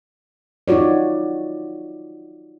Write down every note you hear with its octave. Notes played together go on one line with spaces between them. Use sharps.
D#4 F4 F#4 C#5 D5